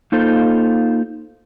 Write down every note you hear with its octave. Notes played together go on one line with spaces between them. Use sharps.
A#3 D#4 F4 A4 C5